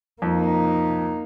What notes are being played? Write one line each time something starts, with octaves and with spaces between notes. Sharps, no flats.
F2 A#3 D#4